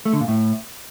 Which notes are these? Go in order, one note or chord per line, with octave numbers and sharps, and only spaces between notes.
A3
D3
A#2
A2